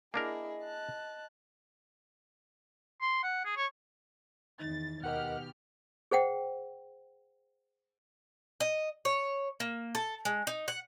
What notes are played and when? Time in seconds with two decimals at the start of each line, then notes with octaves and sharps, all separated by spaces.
0.14 A#3 D4 E4 G#4 A#4 D#5
0.63 A5 F#6
3.01 C6
3.24 F#5
3.45 G#4
3.57 C#5
4.59 E2 D#3 D#4 A6
5.03 D#2 B2 G4 A#4 D#5 F#5 F6
6.11 G#4 C5 F#5 G5
8.60 D#5
9.05 C#5
9.60 A#3
9.95 A4
10.25 G#3
10.47 D#4
10.68 F#5